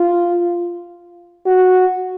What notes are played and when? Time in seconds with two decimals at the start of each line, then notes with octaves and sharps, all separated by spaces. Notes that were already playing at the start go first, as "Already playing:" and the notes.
Already playing: F4
1.46 F#4